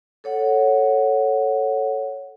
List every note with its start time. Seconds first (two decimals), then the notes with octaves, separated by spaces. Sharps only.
0.24 A4 C#5 F#5